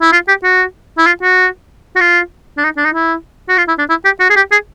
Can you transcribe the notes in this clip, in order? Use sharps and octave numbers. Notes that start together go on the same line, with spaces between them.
E4
F4
G4
F#4
E4
F4
F#4
F#4
F4
D4
D#4
D4
D#4
E4
F#4
F4
E4
D4
E4
G4
F#4
G#4
G4
G#4